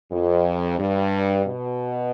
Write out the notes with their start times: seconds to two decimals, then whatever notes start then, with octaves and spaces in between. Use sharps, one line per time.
0.11 F2
0.79 G2
1.46 B2